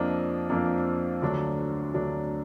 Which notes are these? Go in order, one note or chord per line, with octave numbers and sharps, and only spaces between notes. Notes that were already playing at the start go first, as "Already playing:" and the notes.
Already playing: F2 F3 A#3 D4 D#5
F2 F3 A#3 D4
D2 D3 F#3 D4
D2 D3 F#3 D4